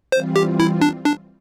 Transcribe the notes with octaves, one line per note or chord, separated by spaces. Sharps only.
E3 G3 C4 F4 C5
G4
E4
D4
D4